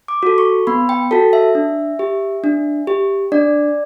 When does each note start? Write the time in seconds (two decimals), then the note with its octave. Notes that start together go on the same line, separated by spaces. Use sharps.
0.08 D6
0.23 F#4 A4
0.38 C#6
0.67 B3 B5
0.89 G5
1.11 F#4 A4 A5
1.33 E5
1.55 D4
1.99 G4
2.44 D4
2.87 G4
3.32 D4 D5